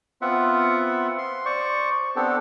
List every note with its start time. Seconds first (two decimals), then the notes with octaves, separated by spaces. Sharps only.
0.22 B3 C4 F4 E5 F#5
1.18 C6
1.45 C5 D5 C#6
2.16 B3 C4 D4 G4 A4